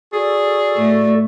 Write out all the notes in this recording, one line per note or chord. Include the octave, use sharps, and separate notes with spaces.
F#4 G#4 A4 D5
A2 A3